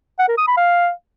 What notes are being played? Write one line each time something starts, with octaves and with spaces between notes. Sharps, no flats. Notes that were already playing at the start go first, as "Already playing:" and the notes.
F#5
A#4
D#6
B5
F5